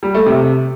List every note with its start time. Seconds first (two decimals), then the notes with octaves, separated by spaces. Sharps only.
0.03 G3
0.15 A3
0.26 C3